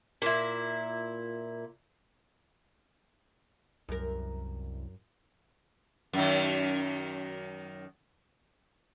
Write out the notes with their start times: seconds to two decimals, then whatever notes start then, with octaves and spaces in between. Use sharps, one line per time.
0.22 A#2 E4
3.89 C2 F#2 A#4
6.13 F#2 D#3